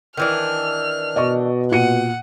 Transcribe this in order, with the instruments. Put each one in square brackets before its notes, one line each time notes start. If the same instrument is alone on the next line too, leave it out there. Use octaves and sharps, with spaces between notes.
[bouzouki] D#3 E3 D4 [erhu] F6
[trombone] B2 [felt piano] D5 D#5 C#6
[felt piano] A#2 C#7 D#7 [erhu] F#5